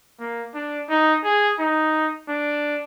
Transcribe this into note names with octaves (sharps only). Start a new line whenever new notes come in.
A#3
D4
D#4
G#4
D#4
D4